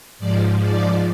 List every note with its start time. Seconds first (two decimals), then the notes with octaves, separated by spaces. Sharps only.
0.19 G#2 F3 D5
0.61 D5